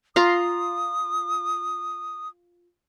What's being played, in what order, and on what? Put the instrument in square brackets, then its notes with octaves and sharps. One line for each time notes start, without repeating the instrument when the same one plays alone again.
[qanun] F4 A#5 C6 [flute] D#6